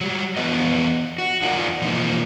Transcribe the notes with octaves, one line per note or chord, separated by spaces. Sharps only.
F#3 G3
F2 E3 B3 B4 D#5
F#4
E2 D#4 F4 A#4 D5 G#5
B2 E3 F3 A#3 C4 D#4